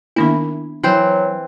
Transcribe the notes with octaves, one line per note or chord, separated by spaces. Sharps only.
D#3 A#3 B3 D4 E4 B5
E3 F#3 C4 C5